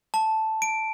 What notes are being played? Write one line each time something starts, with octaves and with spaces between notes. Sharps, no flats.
A5
D7